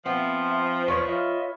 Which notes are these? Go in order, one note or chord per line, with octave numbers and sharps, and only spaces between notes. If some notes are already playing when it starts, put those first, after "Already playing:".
F3 B3 C4 C5 E5
E2 B4 C#5 C#6
F4 D#5 E5